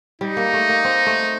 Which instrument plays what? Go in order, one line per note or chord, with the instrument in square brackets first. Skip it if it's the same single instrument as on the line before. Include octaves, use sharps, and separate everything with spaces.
[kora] G3 [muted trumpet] D#4
[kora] A#3
A3
A#3
C4
A3